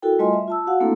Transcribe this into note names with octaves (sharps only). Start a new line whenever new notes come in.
E4 F#4 A4 A#4 G5
G3 A3 F4 D#5 G#5 C6
E5
F4 A5 E6
F#4 F5 F#5
A3 A#3 C4 D4 E4 A4